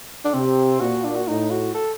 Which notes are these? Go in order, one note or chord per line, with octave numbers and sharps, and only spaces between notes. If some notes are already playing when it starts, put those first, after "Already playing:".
D4
C3 C4
A#2 F#4
D4
F#4
A2 D#4
F#4
A4